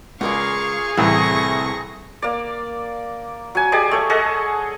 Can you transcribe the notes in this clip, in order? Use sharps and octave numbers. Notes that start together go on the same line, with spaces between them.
C#2 F4 G#4 A#4 D5 F5 C#6
C2 A2 C3 E3 C#6 A#6
A#3 D5
F#3 G#5
G4 G#4 D5 D#5
A3 C#5
G#4 A4 D#5 F#5